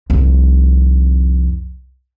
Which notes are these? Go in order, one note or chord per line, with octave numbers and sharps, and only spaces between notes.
C2 F2